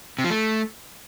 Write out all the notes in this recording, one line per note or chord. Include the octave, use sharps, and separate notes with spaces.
C3
F3
A3